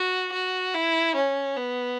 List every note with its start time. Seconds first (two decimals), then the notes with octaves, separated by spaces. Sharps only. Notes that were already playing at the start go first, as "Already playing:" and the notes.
Already playing: F#4
0.33 F#4
0.74 E4
1.16 C#4
1.57 B3